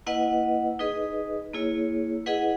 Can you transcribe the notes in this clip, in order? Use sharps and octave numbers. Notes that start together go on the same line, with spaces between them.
A#3 E4 B4 D#5 F#5
D#4 G#4 B4 D#5
A#3 E4 G#4 C#5
E4 G#4 B4 D#5 F#5